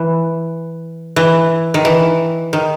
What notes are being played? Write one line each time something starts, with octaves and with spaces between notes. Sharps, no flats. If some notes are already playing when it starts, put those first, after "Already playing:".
Already playing: E3
E3
D#3
E3
D#3